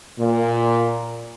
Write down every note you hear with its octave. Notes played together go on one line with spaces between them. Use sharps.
A#2